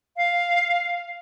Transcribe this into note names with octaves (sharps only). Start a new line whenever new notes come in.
F5